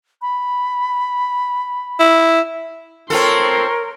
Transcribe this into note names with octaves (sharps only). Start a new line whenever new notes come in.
B5
E4
C4 F4 A4 A#4 C#5 C6